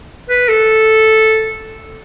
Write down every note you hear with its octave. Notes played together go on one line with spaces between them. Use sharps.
B4
A4